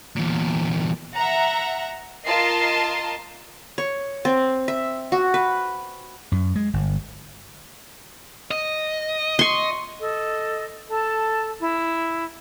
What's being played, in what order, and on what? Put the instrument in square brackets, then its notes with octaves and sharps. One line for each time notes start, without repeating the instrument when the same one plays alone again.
[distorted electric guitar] E2 A#2
[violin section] E5 F#5 A#5
F4 A#4 D#5 A5 C7
[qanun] C#5
C4
E5
F#4
B4
[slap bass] F#2
G#3
G1
[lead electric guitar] D#5
[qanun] C6 C#6
[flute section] A4 D#5
A4 A5
E4